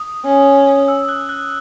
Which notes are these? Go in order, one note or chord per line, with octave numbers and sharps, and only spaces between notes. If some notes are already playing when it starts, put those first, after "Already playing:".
Already playing: D#6
C#4
E6
F#6
F#6